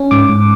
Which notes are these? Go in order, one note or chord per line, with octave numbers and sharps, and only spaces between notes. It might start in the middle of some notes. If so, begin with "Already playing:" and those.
Already playing: C#4
G#2 D6
G#2